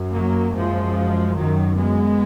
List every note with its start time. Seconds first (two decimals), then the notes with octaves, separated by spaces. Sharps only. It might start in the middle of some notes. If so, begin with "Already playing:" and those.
Already playing: F#2
0.14 F#3 A#3
0.55 F#2 F3 G#3
1.37 F#2 D#3 F#3
1.78 G#3 B3